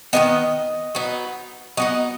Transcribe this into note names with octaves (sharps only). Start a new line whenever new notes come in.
D#3 G#3 B3 D#5
F#3 B3 D#4
F#3 B3 D#4 D#5